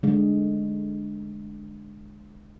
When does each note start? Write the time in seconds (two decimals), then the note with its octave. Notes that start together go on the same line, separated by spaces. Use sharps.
0.03 D3 G#3